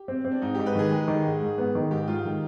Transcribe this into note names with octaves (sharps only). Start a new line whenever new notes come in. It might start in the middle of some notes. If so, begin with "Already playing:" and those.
Already playing: G4
C4
C4
D4
G#2 D#4
G#2 G4
B4
D#3 G#4
G#3
D#3
G#2
G#2
B3
D#3
G#2 G4
G#2 F4
G4
D#3